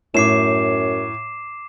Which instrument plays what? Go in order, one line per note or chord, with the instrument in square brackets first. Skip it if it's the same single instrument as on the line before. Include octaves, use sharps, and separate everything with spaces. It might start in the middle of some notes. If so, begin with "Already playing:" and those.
[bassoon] F#2 [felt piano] A2 [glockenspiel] D6 C7 E7